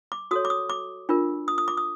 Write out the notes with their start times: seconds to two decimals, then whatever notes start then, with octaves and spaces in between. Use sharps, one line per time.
0.12 D6
0.31 F#4 A4 C#5 D#6
0.45 D6
0.50 D#6
0.70 D6
1.09 D4 F4 A#4
1.48 D#6
1.58 D#6
1.68 D6
1.77 D#6